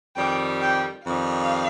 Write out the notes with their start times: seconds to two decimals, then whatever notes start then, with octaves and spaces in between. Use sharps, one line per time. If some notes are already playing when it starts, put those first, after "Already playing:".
0.16 F2 D#3 G3 G5
0.61 G5
1.06 F2 D#3 G3 F5